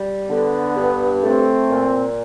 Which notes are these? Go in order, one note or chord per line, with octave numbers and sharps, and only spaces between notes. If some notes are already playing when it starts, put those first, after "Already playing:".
Already playing: G3
D3 B3
G2
A3 C4
A#2